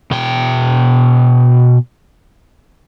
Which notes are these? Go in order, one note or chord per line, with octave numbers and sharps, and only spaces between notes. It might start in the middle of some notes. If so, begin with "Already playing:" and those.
B2 G5